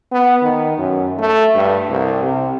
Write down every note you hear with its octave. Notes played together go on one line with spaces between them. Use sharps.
B3
D#3
F#2
A3
G2
C2
C3